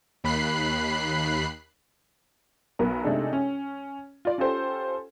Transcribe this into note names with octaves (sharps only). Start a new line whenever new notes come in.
D#2 B5 F#6 C7
B1 B3 A#4
C3 G#3 A3 D4 D#4 A4
C#4
F4 D5
C#4 F4 G4 A4 C5